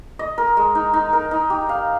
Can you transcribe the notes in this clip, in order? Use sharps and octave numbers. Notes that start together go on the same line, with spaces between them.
D#5
A#4
G#3
D#4
D#4
A#4
D#4
G4
F5